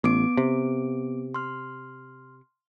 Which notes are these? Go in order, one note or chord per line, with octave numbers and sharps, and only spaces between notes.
A1 B3 D6 D7
C3
C6 F6